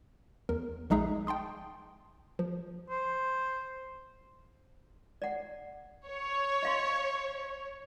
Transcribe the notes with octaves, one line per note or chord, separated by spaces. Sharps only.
E2 A#4
A#1 G#3 D#4 G#4 E5
G5 A5 C6 D#6
F3
C5
D5 F#5
C#5
D#5 F5 C6